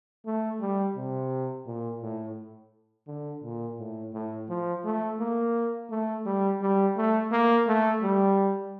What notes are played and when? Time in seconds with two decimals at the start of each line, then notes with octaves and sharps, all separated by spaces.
0.26 A3
0.60 G3
0.96 C3
1.66 A#2
2.02 A2
3.07 D3
3.43 A#2
3.79 A2
4.14 A2
4.49 F3
4.84 A3
5.19 A#3
5.90 A3
6.26 G3
6.62 G3
6.97 A3
7.32 A#3
7.67 A3
8.02 G3